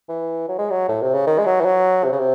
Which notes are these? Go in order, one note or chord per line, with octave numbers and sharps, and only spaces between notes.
E3
F#3
G#3
F#3
A2
C3
C#3
D#3
G#3
F#3
E3
F#3
C3
C#3
C3